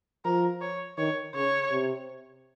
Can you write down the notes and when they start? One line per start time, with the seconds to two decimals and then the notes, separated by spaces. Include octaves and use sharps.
0.25 F3 A#4
0.62 C#5
0.98 D#3 C#5
1.35 C#3 C#5
1.71 C3